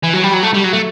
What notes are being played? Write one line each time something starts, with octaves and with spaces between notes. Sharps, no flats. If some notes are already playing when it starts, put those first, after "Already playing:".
E3
F#3
G3
F#3
A3
G3
F#3
A3